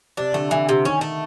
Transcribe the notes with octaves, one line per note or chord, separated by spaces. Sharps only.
C3 D4
D3 A3
D3 E3
C3
D#3 C#4
A3